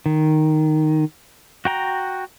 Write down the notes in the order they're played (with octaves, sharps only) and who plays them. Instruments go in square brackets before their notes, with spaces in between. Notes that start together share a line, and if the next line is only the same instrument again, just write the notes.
[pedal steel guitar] D#3
F#4 G5 A#5